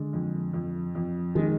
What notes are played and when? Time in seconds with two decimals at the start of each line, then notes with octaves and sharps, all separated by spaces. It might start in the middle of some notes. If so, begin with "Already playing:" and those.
Already playing: D3 G#3
0.13 F2
0.53 F2
0.95 F2
1.35 D#3 G#3